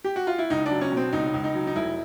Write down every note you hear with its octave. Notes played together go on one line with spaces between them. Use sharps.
G4
F#4
F4
E4
C#2 D#4
D4
F#3
C#4
B2 C4
C#2 D#4
C#2
D#4
F#3
D#4
F1 E4